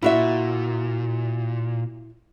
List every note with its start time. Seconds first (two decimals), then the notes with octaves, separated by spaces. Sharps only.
0.02 A#2 E4 F#4 E5